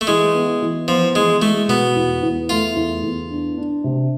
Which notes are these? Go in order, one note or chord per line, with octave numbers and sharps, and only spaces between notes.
A3
E3 G#3
B3
E3
F3 B3
E3 G#3
G#3 A3
B2 B3
E2
E2
A3 F4
E2
E2
D4
D4
C3